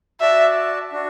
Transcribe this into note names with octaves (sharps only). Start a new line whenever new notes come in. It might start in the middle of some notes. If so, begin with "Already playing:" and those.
F#4 D5 E5 A5
D4 F#4